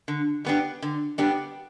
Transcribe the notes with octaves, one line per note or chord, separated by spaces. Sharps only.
D3
G3 B3 D4 G4
D3
G3 B3 D4 G4